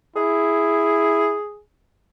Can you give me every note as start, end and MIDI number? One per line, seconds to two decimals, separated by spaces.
0.16 1.39 64
0.16 1.59 68